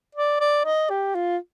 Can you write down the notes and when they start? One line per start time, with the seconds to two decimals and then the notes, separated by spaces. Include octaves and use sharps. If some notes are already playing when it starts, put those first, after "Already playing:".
0.15 D5
0.40 D5
0.65 D#5
0.90 G4
1.15 F4